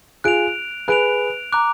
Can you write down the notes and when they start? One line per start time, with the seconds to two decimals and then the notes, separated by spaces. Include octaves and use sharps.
0.24 F4 G#4 F#6 D7 F7
0.88 G#4 B4 F#6 D7 F7
1.52 A#5 D6 F#6